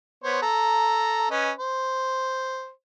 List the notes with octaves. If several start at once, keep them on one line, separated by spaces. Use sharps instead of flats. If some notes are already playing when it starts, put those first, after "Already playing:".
B3 C5 C#5
A4 A#5
C#4 B4 D#5
C5